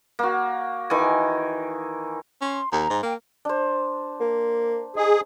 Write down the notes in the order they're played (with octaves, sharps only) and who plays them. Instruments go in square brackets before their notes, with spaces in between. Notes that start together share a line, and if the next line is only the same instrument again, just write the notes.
[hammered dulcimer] A#3 F#4
D#3 E3 G#5
[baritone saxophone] C#4 [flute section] C6
[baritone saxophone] D#2 [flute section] A#5
[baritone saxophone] G#2
[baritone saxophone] A#3 [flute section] G5
[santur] D4 C5
[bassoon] A#3
[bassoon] D#4 [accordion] G#4